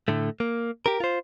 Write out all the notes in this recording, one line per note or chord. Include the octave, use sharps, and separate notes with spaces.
A2 D3 A3
A#3
G4 A#4
F4 C5